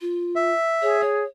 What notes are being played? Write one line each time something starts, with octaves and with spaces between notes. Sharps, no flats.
F4
E5
G#4 C#5
C#5